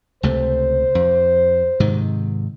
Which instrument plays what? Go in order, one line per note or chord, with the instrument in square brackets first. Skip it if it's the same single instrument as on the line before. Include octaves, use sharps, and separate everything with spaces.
[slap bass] C#2 C3 A3 [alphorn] C5
[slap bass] F2
G#2 C3 D#3